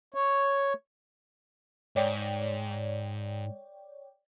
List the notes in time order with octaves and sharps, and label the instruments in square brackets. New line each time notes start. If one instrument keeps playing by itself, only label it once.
[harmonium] C#5
[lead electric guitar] G#2 [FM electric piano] C#5 D5 G5